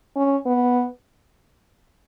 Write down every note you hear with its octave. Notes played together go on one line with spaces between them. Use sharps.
C#4
B3